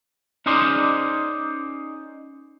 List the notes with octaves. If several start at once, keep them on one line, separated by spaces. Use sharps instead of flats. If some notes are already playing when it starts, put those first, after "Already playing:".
C#4 D#4 G#4 C5 D5